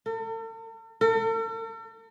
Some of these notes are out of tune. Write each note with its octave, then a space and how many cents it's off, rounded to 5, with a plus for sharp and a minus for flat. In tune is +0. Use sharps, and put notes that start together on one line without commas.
A4 +45
A4 +45